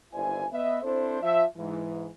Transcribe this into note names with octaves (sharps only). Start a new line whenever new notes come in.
G1 D#2 E4 C5 D5 G#5
B3 B4 D#5 E5
C4 D4 E4 A4 C5
F3 E5
G#2 E3